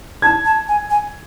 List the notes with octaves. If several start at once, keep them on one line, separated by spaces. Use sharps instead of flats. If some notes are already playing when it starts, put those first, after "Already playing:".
A5 G#6
A5
G#5
G#5